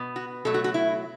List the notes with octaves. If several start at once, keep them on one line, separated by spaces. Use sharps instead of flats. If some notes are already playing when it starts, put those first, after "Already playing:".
Already playing: B2 B3
F#4
B2 F#3 A3 A4
F#4
F#4
E4